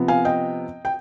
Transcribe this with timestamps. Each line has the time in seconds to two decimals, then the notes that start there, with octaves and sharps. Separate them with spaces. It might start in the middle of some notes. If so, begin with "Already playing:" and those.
Already playing: C3 F3 B3
0.08 F5 G#5
0.25 D#5 G5
0.85 G5